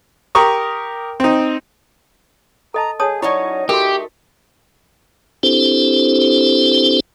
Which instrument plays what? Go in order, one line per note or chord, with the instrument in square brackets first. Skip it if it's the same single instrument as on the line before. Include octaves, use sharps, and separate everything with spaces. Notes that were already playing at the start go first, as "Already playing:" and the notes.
[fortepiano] G4 A#4 A#5 C#6 D#6
C4 D#4
[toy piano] A4 D#5 A5 [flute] A#5
[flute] G#4 [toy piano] C#5 A5 D#6
[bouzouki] F#3 C#4 C#5 [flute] D#4 [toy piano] E4 D5
[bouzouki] A3 [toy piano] F#4 A#4 [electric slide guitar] G4
[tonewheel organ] C4 D4 E4 G4 A4 C5